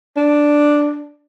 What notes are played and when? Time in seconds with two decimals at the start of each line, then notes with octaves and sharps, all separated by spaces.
0.17 D4